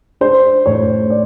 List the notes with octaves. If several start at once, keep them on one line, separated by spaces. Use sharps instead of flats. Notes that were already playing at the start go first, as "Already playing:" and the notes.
D4 C5
A2 C#5
C5
C#5
D5